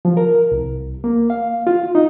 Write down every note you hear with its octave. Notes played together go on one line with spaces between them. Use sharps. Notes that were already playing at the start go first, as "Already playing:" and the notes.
F3
A#4
C2
A#3
F5
F4
D#4